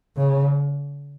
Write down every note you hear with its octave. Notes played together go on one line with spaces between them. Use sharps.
C#3